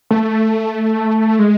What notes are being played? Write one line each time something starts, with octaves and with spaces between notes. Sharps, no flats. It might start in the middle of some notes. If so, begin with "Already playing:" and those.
A3
G#3